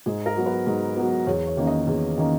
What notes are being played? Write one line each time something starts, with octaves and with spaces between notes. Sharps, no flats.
G#2 G#4
A#4
F#3 B3
B4
G#2
F#3 B3
E2 C#5
C#5
D#3 A#3 C#4
D#5
E2
D#3 A#3 C#4